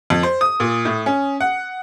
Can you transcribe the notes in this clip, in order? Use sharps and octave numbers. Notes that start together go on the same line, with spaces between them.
F2
C5
D#6
A#2
A2
C#4
F#5